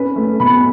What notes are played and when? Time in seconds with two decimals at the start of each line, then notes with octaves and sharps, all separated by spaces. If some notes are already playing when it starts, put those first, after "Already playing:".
Already playing: C#4 B4
0.16 A3
0.40 B2 B5